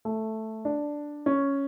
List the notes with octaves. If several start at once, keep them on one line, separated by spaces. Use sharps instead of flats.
A3
D4
C#4